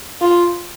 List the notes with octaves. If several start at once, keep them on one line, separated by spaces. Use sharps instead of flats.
F4